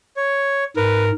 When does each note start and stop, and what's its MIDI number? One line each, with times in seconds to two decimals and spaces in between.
0.17 0.64 73
0.77 1.12 44
0.77 1.11 70
0.77 1.04 71